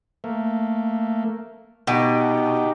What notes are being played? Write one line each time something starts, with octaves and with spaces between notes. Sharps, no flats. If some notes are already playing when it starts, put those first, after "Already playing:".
A3 A#3
B2 D#4 F#4 G4